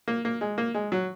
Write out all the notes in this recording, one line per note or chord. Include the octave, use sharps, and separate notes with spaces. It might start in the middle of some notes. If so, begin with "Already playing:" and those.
A#3
A#3
G#3
A#3
G#3
F#3